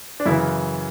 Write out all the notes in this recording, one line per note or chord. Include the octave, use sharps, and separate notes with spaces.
D4
F#2 C#3 E3 E4